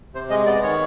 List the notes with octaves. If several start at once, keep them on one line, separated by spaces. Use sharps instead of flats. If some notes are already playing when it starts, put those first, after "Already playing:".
C3 C5
G#3 D#5
B3 D5
D#3 C#5